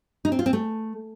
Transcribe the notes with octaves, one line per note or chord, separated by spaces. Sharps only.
D#4
C4
F4
C4
A3